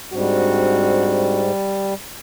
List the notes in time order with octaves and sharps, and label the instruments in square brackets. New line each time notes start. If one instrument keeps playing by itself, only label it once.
[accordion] G#2 [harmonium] G3 [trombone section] C4 D4 F#4